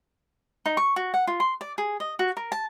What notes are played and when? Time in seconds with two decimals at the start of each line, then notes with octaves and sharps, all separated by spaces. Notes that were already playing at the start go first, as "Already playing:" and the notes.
0.66 D#4
0.77 C#6
0.96 F#4
1.14 F#5
1.27 F4
1.40 C6
1.61 D5
1.78 G#4
2.00 D#5
2.19 F#4
2.37 A#4
2.52 A5